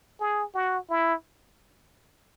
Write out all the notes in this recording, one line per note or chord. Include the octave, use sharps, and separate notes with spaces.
G#4
F#4
E4